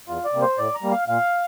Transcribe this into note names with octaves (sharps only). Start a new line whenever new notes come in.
E2 F4
D5
C3 G3 A#3
C5
A2 D5
A#5
G3 A#3
F5
A#2 F5